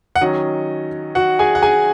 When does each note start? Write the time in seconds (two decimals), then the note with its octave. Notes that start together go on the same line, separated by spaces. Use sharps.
0.16 F#5
0.21 D#3 F#3 C#4 D#5
1.15 F#4 F#5
1.39 G#4 G#5
1.55 F#5
1.63 G#4 G#5